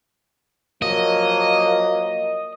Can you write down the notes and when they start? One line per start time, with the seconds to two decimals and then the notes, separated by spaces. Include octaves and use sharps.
0.82 F3 F#3 A#3 D#5